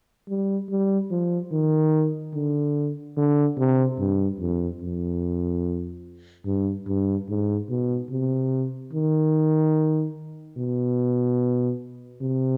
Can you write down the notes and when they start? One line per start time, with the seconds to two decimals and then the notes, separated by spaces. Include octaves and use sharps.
0.29 G3
0.70 G3
1.11 F3
1.52 D#3
2.34 D3
3.17 D3
3.58 C3
3.99 G2
4.40 F2
4.82 F2
6.46 G2
6.87 G2
7.29 G#2
7.70 B2
8.11 C3
8.93 D#3
10.58 B2
12.22 C3